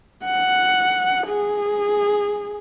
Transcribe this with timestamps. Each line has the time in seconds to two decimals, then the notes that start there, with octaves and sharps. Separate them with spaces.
0.25 F#5
1.27 G#4